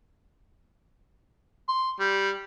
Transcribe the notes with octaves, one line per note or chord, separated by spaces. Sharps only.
C6
G3